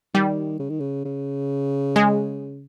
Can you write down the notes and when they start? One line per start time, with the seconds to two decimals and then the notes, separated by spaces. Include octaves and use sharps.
0.14 D#3 G3
0.59 C#3
0.70 D#3
0.80 C#3
1.05 C#3
1.96 G#3